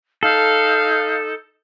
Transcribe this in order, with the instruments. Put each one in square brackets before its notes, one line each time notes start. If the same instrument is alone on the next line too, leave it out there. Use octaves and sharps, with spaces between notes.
[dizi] D#4 [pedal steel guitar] A4 [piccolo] F5